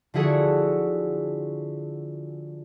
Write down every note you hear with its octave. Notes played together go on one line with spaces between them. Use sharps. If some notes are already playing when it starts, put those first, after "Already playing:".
D3 F3 E4 F#4 G#4 A4